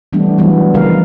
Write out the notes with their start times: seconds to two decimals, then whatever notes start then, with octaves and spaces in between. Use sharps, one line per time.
0.13 E3 G3 A3 B3 D4
0.38 E3 F#3 G3 B3 E4 F#4
0.74 C#3 F3 G#3 A#4 F5